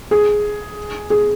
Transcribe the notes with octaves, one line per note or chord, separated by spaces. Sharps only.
G#4
G#4